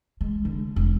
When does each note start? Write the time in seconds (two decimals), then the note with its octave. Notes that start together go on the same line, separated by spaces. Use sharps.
0.21 G#3
0.45 D3
0.76 E1